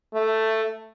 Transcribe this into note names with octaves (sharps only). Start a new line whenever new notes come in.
A3